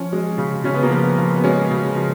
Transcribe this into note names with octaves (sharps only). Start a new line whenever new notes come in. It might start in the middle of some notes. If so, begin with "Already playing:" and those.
Already playing: F3 C#4
G#3
C#3
C#3 C#4
B3
A#3
F3 B3
B3
F3
B3
G#3 C#4
C#3
F3